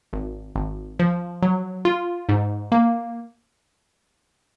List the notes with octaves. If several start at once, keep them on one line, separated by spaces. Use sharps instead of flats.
G#1
G#1
F3
F#3
F4
G#2
A#3